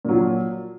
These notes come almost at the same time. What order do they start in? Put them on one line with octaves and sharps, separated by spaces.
A#2 F#3 F3